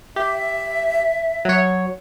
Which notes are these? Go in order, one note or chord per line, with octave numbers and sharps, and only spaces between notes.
G4 E5
F#3 C#5